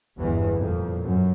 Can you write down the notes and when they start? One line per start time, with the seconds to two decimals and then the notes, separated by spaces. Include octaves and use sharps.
0.17 G1 E2 E3 G#3
0.55 F2 A#2
1.03 F#2